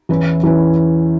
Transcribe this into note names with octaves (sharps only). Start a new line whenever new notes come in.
E2 E3 C#4 E4 B4
E2 E3 C#4 E4 B4